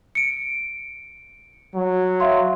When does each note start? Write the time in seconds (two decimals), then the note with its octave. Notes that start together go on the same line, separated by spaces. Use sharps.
0.15 C#7 D7
1.75 F#3
2.20 E5 F5 C6